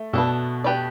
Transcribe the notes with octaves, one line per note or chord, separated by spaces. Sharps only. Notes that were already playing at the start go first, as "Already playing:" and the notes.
Already playing: A3
B2 B3 D4 A4
D4 G4 B4 D5